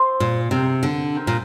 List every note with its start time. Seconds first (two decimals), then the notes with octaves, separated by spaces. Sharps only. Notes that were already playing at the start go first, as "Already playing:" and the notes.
Already playing: C4 F4 C5
0.20 A#2
0.51 C3 C4 A#4 G5
0.83 D3
1.15 C4 A#4 G5
1.27 A#2